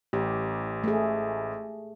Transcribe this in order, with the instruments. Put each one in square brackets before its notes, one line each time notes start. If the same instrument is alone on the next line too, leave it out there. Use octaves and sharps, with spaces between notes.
[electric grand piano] A1 [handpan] G4
[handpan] A3 G#4